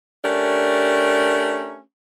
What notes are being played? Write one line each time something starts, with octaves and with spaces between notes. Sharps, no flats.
A3 C#4 D4 G4 A#4